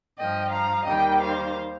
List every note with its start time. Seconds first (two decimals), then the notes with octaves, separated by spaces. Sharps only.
0.18 G2 F3 D#5 G5
0.52 F5 A#5
0.86 D#2 D#3 G3 D#5 G5
1.19 C5 F5